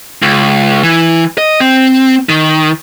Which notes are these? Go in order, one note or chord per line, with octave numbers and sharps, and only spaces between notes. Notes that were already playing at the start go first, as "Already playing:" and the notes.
C#2
E3
D#5
C4
D#3